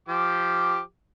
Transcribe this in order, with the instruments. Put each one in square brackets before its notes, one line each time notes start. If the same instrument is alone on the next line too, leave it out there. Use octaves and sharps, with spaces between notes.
[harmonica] F3 G4 D6